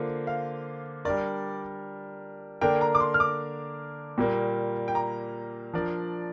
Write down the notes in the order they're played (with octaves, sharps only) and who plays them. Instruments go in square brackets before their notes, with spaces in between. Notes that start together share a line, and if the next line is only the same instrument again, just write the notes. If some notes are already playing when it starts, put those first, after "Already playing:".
Already playing: [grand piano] D3 A#3 F4 C5
[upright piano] F5
[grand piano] G3 D4 A#4 [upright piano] D5
[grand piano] D3 A#3 D4 A#4 [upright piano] G5
[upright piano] A#5
D6
C6
F6
D6
[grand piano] A#2 G3 A#3
[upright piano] G5
A#5
[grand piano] F3 D4 A#4 D5